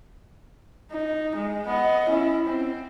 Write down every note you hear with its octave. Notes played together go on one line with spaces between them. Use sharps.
D#4
G#3
B3 D#5
C#4 E4
C4